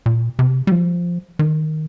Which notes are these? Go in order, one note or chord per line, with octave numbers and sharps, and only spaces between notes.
A#2
C3
G3
F3
D#3